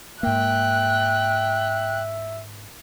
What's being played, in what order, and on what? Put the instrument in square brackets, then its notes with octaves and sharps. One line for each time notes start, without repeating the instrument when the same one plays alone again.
[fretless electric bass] G#2 A#3 [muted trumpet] E5 [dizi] G5 [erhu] F#6